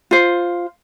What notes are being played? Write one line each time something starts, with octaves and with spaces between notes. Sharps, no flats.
F4 C5